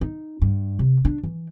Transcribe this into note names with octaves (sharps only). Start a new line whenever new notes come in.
D#4
G2
C3
D4
E3